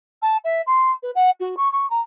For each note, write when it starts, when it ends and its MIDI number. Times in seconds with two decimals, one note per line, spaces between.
0.22 0.37 81
0.44 0.62 76
0.67 0.91 84
1.03 1.11 71
1.15 1.30 78
1.40 1.55 66
1.57 1.71 85
1.72 1.89 85
1.90 2.01 82